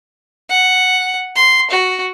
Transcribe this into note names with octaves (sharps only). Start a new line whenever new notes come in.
F#5
C6
F#4